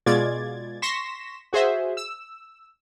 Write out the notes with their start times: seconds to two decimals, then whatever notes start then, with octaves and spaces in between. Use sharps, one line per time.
0.06 B2 G#3 F4 D5 G#6 A6
0.82 C6 C#6 A#6 B6 E7
1.53 F#4 G#4 C5 E5
1.97 E6